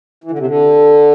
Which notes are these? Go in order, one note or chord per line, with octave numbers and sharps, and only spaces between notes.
E3
D3
C3
D3